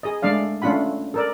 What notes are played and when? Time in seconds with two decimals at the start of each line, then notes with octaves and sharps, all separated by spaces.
0.03 G#4 D#5
0.22 G#3 A3 D4 D5 F5
0.62 A3 C#4 D4 F4 F#5 B5
1.14 A4 A#4 D5